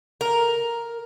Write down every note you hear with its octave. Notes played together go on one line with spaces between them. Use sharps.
A#4